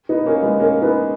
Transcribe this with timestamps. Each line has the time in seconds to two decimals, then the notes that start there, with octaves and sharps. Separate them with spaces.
0.09 B3 D#4
0.26 A#3 C#4
0.42 G#3 B3
0.59 A#3 C#4
0.82 B3 D#4